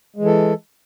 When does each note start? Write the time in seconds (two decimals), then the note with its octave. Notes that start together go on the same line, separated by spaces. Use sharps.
0.16 G#3
0.21 E3
0.26 A4